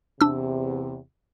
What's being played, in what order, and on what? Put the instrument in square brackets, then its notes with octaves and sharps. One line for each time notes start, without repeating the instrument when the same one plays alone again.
[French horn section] E2 C3 [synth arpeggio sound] D4 E6